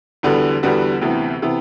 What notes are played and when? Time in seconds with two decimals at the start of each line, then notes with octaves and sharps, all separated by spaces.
0.23 E2 D3 G3 B3 F#4
0.63 E2 D3 G3 B3 F#4
1.01 D2 C3 E3 B3
1.42 C3 E3 B3